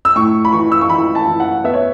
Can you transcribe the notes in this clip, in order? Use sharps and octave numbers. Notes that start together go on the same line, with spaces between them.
E6
A2 C#6
B5
E3 C#6
E6
C#6
E3 B5
A5
E3
F#5
B3 E5
C#5